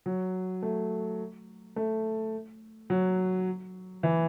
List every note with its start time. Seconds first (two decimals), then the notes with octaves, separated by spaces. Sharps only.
0.06 F#3
0.62 A3
1.76 A3
2.90 F#3
4.03 E3